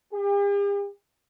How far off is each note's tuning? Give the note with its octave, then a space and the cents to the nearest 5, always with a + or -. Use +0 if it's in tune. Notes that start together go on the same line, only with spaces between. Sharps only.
G4 +45